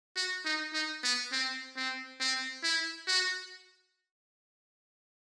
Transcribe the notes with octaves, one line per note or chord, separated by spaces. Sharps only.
F#4
D#4
D#4
B3
C4
C4
C4
E4
F#4